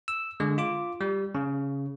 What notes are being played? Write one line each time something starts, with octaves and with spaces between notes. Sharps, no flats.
E6
D3 G#3
F4 D6
G3
C#3